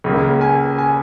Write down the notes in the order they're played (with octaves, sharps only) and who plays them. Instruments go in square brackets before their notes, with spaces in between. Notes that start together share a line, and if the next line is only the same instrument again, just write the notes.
[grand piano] C#2 C#3 A#3
G#5
G#5